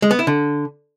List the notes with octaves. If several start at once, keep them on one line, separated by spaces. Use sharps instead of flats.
G#3
B3
E4
D3